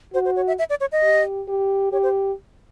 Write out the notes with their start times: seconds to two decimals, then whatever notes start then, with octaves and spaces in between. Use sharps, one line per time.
0.14 F#4 C5
0.25 C5
0.36 C#5
0.47 E5
0.59 E5
0.70 D5
0.81 C#5
0.92 D#5
1.02 G4
1.48 G4
1.92 G4 C#5
2.03 C5